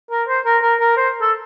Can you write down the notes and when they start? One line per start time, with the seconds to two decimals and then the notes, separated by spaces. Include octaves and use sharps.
0.11 A#4
0.28 C5
0.45 A#4
0.62 A#4
0.80 A#4
0.97 C5
1.21 A4